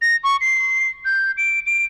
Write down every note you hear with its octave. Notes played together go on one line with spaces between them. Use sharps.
A#6
C#6
C7
G6
D7
D7